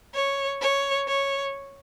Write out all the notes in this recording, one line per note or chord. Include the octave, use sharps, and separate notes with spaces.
C#5
C#5
C#5